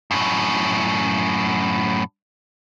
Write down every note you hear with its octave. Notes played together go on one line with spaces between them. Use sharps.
F#2 A2